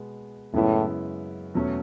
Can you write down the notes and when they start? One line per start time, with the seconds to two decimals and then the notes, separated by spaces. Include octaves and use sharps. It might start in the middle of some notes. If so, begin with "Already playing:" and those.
Already playing: B2 G#3 B3
0.54 F#2 A2 C#3 G#3 B3 E4
1.54 E2 B2 F#3 A3 C#4